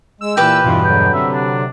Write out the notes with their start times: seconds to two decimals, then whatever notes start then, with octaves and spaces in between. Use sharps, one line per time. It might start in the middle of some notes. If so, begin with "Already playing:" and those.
0.21 G#3 E6
0.37 A#2 E3 G4 B4 G5 D6
0.64 E2 G2 B2 E3 F4
0.85 D3 F#3 G5
1.14 C3 E5
1.33 D4